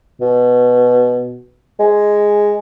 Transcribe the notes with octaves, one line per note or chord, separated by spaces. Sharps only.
B2
G#3